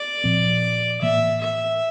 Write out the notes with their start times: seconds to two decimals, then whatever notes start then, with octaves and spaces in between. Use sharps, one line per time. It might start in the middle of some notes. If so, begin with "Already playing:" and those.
Already playing: D5
0.24 A#2 F3 C4
1.02 A2 E3 A#3 E5
1.42 E5